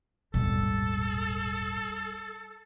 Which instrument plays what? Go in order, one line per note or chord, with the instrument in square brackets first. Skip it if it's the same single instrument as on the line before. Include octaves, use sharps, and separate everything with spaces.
[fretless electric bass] D#1 G#1 B2 [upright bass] G3 [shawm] A4